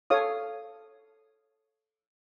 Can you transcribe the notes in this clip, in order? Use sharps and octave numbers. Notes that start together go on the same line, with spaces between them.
A4 C#5 F5 D#6